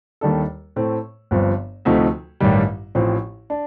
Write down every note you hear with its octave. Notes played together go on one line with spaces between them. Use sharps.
D#2 D#3 G3 D4 A4
A2 A3 C4
G1 G2 F3 C4
D2 C3 F3 A3 D#4
A1 G2 D#3 G3
A1 A2 F3 C4
D4